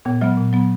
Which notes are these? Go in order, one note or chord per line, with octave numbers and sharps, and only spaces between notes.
A#2 B3
F#3 G#3 B3
A#2
F#3 B3